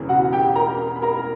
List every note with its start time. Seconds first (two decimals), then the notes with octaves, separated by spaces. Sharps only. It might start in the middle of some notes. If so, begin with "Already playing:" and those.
Already playing: E1 E2 C#3 E3
0.09 F#4 F#5
0.33 G4 G5
0.55 A#4 A#5
0.96 B5
1.02 A#4 A#5